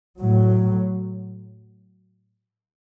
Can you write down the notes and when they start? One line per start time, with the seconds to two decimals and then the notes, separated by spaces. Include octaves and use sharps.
0.20 A2 F#3